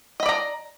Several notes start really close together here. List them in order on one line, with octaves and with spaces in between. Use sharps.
D#5 B5 D5 A#5